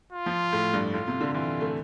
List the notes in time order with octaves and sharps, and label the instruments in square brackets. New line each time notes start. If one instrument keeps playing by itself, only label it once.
[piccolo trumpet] F4
[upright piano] F3
A2
G2
[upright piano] A2 [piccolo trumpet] F4
[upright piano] C3
D3
[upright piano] E3 [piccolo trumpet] F4
[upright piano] A3